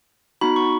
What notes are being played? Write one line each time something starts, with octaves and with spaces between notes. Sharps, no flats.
B3 D#4 F#4 B5
C#6